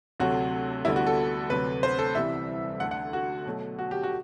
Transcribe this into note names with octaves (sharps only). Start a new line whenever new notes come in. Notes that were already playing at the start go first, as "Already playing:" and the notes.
D2 C3 F#3 A3 F#4
D2 D3 G3 B3 E4
F#4
A4
D2 C3 F#3 B4
C5
A4
C2 C3 E3 G3 E5
D2 D3 A3 F#5
F#5
F#4
B2 F#3 A3
F#4
G4
F#4